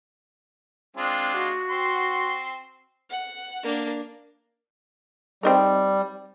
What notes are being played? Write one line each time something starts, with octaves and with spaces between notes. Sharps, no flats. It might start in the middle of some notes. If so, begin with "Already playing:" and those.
G#3 C4 D4 F4
F#4
C4 C6
F#5
A#3 D4
G3 C4 D#4 A#4